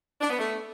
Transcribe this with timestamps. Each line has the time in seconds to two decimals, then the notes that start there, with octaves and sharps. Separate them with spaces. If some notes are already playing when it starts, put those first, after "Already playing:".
0.21 D4
0.30 B3
0.39 A3